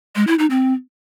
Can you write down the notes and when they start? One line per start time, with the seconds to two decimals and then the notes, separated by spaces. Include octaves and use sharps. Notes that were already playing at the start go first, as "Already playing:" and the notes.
0.16 G#3
0.27 E4
0.39 D#4
0.50 C4